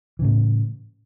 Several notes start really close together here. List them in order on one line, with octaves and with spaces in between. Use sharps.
E3 C#3 A2